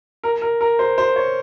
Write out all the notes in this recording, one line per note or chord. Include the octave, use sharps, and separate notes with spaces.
A#4
A#4
A#4
C5
C5
C#5